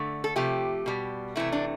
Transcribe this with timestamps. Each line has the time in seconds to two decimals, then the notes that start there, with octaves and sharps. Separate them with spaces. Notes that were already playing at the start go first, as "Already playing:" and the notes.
Already playing: D3 A3
0.24 A4
0.36 C3 F3 A3 G4
0.86 B2 G3
1.36 C3 E3 A3 E4
1.52 D4